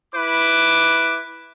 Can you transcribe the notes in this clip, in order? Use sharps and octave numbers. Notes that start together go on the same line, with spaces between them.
E4 B4 D6